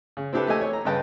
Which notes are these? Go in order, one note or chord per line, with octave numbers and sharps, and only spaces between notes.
C#3
C4 D4 E4 G4 A4 B4
A3 A#3 G4 A4 D#5 G#5
C#5
A#5
G2 C#3 B4 D#5 G5 A5